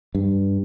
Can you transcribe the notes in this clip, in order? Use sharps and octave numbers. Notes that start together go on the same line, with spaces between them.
G2